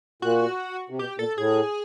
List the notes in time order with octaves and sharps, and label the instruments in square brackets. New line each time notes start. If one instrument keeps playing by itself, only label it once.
[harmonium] A#2 [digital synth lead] F#4
[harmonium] C3
[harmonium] B2 [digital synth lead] G4
[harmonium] A#2 [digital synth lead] A4
[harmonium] A2 [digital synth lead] G#4